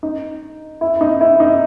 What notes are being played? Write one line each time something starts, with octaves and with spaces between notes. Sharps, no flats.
D#4
E4
D#4
E4
D#4